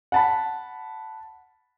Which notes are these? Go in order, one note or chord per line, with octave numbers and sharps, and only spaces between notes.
F#5 A5 B5